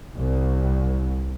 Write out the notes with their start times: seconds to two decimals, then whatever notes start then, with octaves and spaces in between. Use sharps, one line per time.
0.15 C2